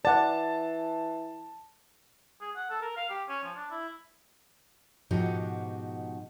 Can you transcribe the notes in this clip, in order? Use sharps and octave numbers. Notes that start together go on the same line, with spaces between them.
E3 D5 F#5 A5 A6
G#4
F#5
A4
A#4
F5
G4
C#4
F3
D4
E4
G#2 B2 F3 D#4 F#4 G4